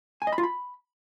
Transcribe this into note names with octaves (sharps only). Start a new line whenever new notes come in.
G#5
D#5
B5
F4
B5